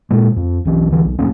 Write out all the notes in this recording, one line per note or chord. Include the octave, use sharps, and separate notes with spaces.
A#2 G#3
F2
B1 E3
D2 E3
B1
D#1 F#3 A#3 C#4